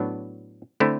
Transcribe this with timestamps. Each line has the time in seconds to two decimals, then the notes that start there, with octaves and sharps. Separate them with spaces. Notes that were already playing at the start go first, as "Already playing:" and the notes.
Already playing: A2 F#3 B3 D4
0.80 D3 A3 C4 E4